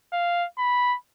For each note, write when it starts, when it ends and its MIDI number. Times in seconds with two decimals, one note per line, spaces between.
0.13 0.46 77
0.58 0.96 83